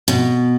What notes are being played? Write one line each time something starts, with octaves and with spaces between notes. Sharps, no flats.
B2